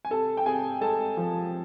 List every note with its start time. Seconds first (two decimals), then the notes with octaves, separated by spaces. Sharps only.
0.05 G#5
0.10 C3 A4 A5
0.37 G5
0.46 C3 G#4 G#5
0.81 G#3 A4 A5
1.17 F3